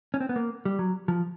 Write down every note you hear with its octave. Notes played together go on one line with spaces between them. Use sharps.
C#4
C4
B3
A#3
G3
F#3
F3